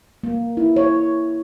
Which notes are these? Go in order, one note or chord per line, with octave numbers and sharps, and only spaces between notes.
A#3
E4
C#5